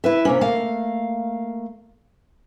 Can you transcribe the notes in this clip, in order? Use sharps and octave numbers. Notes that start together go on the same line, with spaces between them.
E4 B4 E5
C3 A#3 C#4
A3 A#3 F5